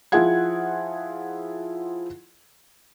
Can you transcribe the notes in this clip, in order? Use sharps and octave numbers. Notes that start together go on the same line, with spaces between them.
F3 E4 F4 G#4 F#5 G#6